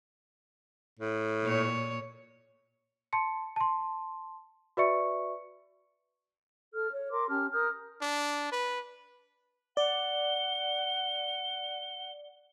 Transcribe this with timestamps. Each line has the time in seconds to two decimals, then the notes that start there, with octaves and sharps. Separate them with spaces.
0.99 A2
1.43 A#2 C#5
3.13 A5 C6 C#7
3.56 A5 C6
4.77 F#4 B4 D5 E5 C#6 C#7
6.73 A4 F6
6.91 C#5
7.11 A#4 C6 D6
7.29 C#4 G4 A5 F6
7.52 A#4 D#6 F6 G6
8.01 D4
8.52 B4
9.77 D5 F#5 G7